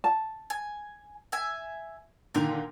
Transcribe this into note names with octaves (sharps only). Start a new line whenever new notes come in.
A5
G#5
E5 G#5
A#2 D3 D#3 A#4 F5 G5